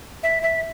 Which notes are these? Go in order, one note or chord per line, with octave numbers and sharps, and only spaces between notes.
E5
E5